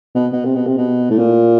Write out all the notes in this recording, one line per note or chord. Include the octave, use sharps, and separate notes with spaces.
B2
B2
C3
B2
C3
B2
A2
A#2